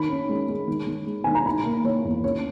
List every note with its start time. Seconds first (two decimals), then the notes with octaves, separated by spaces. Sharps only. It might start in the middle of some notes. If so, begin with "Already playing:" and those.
Already playing: D#3 B5
0.10 C#4
0.29 G#3
0.48 G#3
0.68 D#3
0.87 D#3
1.06 G#3
1.24 D#3 G#5
1.35 A#5
1.46 D#4 B5
1.65 A#3
1.84 D#3 C#5
2.04 E2
2.23 C#4 C#5